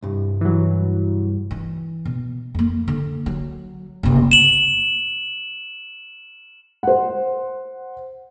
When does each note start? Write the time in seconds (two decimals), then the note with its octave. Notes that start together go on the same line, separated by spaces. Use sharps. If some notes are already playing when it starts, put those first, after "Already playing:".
0.03 C2 G2
0.41 E3 F#3
1.51 E3
2.05 B2
2.55 F2 A#3
2.88 D3
3.26 F#3
4.03 F#1 C3
4.31 E7 F#7
6.83 C5 F#5